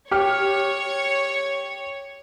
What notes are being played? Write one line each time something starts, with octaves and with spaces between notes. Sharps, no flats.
G4 C#5 F6